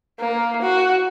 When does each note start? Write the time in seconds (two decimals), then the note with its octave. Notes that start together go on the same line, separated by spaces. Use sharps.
0.20 A#3
0.62 F#4